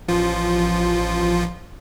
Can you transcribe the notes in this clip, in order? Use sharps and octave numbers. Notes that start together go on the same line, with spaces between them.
A1 F3 F4